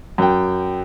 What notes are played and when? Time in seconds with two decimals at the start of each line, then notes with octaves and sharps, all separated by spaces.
0.18 F#2 G5